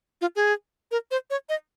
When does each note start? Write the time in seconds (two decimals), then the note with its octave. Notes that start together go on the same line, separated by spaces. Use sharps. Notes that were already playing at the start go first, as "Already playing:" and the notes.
0.21 F4
0.36 G#4
0.91 A#4
1.11 C5
1.30 C#5
1.49 D#5